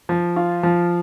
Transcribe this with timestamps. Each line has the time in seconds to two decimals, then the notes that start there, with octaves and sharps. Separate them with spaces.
0.09 F3
0.36 F4
0.63 F3